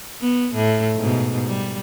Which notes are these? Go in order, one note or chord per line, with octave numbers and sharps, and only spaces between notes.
B3
A2
G#2 B2
G3